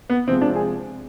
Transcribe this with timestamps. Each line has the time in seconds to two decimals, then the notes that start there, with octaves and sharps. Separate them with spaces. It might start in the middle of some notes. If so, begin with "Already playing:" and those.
0.10 B3
0.27 C3 F3 G#3 C4
0.42 D4
0.56 G#4